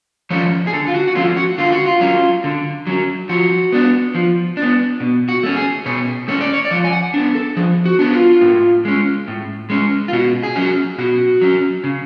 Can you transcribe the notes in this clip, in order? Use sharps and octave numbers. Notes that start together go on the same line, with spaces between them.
F3 A3 C#4 C#5
G#4
D3 A4
F4
F#4
F#4
F3 A3 C#4 F4
F#4
D3 F4
F#4
F4
F#3 C#4
D3
F#3 C#4
F3 F#4
B3 D4
F3
D4
B3
B2
F#4
A3 C#4
G#4
B2 C#5
A3 C#4 C#5
D5
C#5
D5
F3 C#5
G#5
F#5
B3 D4
A4
F3 G#4
F#4
B3 D4
F4
A2
G#3 C#4
A2
G#3 C#4
F4
B2 F#4
G#4
F#3 C#4 F#4
B2 F#4
F#3 C#4
C#3